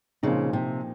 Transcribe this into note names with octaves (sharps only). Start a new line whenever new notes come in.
A#2 C#3 F3 C4 D#4
C3